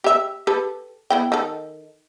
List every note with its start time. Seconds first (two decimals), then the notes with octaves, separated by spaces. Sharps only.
0.04 G4 E5
0.47 G4 A4 B4
1.10 B3 E4 G5
1.32 D#3 A4